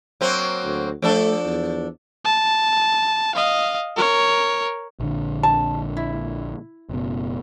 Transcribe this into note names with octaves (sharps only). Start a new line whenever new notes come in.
F#3 A#3 C4
D2
F3 A3 D4 A4
E2
A5
D#5 F5
A#4 C#5
A#1 D3
A5
E4
F#1 B2